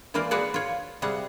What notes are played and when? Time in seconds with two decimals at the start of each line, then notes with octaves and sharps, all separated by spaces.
0.14 E3 A#3 F4 A#4 C5 D5
0.31 F#4 G#4 B4 C#5 D5 F#5
0.54 F4 C#5
1.02 C3 G3 G#4 F#5